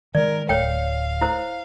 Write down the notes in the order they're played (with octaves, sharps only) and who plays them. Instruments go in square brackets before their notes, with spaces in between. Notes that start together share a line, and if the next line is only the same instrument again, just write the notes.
[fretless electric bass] D#3 G#3 [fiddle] A#4 [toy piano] D5
[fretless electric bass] D1 [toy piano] C#5 G5 [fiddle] F5
[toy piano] E4 C5